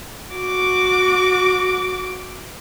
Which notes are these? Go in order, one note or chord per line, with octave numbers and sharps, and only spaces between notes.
F#4 D6